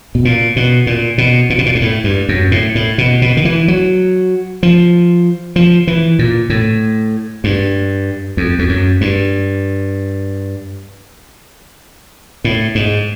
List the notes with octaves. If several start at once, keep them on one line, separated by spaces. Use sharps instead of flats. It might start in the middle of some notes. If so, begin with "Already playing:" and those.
B2
A#2
B2
A#2
B2
A#2
B2
A#2
G#2
A2
G2
F#2
A2
A2
B2
B2
D#3
E3
F#3
F3
F3
E3
A#2
A2
G2
F2
F2
F#2
G2
A2
G#2